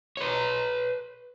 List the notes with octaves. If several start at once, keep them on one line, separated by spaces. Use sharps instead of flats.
B4 C#5